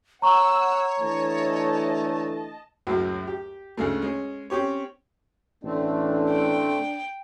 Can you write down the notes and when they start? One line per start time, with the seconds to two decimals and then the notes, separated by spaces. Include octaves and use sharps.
0.22 C#5 F#5 A#5 C#6 E6
1.00 D3 E3 A3 D#5 A5
2.87 C#2 F#2 A2 F#3
3.27 G4
3.77 D2 C#3 G#3 A3
4.02 G#3 C#4
4.50 C4 C#4 G4 C#5
5.63 A1 D3 A3 C4 D4
6.30 G5